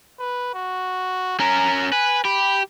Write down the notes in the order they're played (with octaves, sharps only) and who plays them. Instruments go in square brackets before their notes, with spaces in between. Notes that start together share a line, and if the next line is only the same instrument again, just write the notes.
[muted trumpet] B4
F#4
[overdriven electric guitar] C#4 A#4 [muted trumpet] A#5
[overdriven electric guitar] B4 [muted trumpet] G#5
[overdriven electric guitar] G4 [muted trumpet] B5